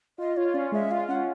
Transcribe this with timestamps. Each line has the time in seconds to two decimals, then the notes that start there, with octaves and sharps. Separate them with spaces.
0.18 F4 D#5
0.37 F4 C#5
0.54 C#4 D5
0.72 G#3 E5
0.91 F4 F5
1.08 C#4 F#5